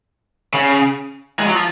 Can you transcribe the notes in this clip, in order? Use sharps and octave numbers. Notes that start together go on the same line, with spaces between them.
C#3
G#3
F#3
F3